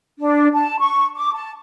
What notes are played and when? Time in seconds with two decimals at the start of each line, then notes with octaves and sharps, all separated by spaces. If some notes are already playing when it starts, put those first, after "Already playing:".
0.19 D4
0.53 A5
0.80 C#6
1.15 D6
1.34 A5